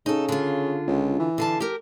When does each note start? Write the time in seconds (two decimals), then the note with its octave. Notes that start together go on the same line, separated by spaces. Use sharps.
0.06 C#3 D#4 A4
0.29 D3 F4
0.87 C#2
1.19 E3
1.38 D3 F5 A5
1.60 G4 A#4